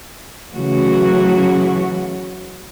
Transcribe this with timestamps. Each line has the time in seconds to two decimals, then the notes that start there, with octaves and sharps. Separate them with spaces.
0.52 C#3 E3 F#3 A3 F#4